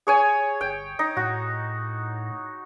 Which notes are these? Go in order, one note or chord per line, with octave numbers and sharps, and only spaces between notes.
G#4 C#5 G#5
G1 G5
D#4
A2 F#4